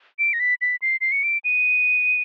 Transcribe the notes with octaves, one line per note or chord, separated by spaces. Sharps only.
D7
A#6
B6
B6
C7
C7
C#7
D7
D#7